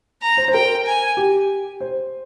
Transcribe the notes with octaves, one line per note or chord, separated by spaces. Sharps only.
A#5
C5
C5
A#4 G5
G#5
G4
C5